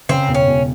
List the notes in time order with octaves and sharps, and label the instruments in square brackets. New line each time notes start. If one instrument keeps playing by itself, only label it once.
[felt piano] C#3 [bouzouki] C4
[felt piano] E1
[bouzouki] C#4
[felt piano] E1